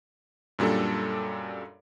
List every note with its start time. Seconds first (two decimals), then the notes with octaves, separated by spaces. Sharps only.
0.59 F#2 A#2 G3 D4 A4